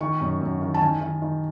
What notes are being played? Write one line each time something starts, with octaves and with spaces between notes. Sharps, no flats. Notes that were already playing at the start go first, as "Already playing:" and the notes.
D#3 C#6
F#2
F#2
D#3
A5
D#3 G#5
D#3
D#3